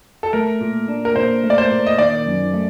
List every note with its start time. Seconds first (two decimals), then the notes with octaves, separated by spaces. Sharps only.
0.23 A4
0.33 A3 A#4
0.61 A#2
0.88 D4
1.05 A#4
1.16 A#2 C5
1.44 A3
1.50 D5
1.58 C5
1.71 A#2
1.87 D#5
1.98 D#3 D5
2.26 F#2
2.53 A3